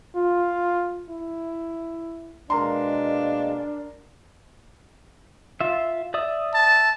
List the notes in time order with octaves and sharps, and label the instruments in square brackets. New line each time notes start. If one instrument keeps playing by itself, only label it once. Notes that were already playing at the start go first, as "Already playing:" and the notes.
[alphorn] F4
E4
[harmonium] B2 G#3 A#3 [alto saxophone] D4 [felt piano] A#4 A#5 C6
[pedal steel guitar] F4 E5
D5 E5 D#6
[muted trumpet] A5